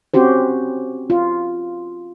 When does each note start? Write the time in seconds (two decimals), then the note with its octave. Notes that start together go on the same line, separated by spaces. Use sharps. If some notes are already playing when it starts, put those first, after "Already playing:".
0.14 C4 C#4 F#4 G4 C5
1.10 F4